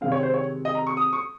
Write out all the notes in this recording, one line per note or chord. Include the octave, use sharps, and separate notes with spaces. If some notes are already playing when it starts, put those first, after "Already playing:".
C3 D#3 G#3 C4 F5
C#5
C5
C#5
D#5
A#5
C#6
D#6
C#6